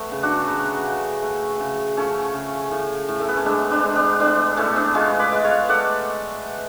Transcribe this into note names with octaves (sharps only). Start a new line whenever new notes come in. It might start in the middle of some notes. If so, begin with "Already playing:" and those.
Already playing: A3 B3
C#3
D4 F#4
F#3 B3
C#3
A3
C#3
F3 A3 C#4
C#3
A2
A2
A3
B3
C#4
G#3 B3 D4
B3 D4
G#3
B3 D4
A2 B3 D4
A2 A3 C#4
B3 D4
G#3 C#4 F4
B4 D5
G#3
C#5 F5
A3 D5 F#5